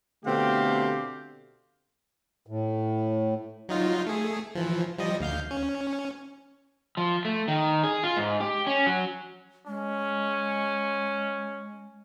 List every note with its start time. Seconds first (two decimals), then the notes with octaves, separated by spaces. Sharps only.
0.24 B2 D3 A3 C4 G4 F5
2.47 A2
3.69 F#3 D#4 F4
4.07 A3 G#4
4.55 E3 F3
4.97 F3 G3 D#5
5.20 D2 F5 G6
5.51 C#4
6.97 F3
7.25 A3
7.48 D#3
7.83 G#4
8.03 F4
8.17 G#2
8.40 G4
8.67 C#4
8.86 F#3
9.67 G#3 C#4